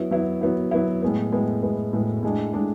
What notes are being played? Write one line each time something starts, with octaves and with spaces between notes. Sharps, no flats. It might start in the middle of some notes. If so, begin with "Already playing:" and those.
Already playing: F#3 B3 E4
F#3 B3 E4
F#3 B3 E4
F#3 B3 E4
A2 G#3 B3
A2 G#3 B3
A2 G#3 B3
A2 G#3 B3
A2 G#3 D4
A2 G#3 D4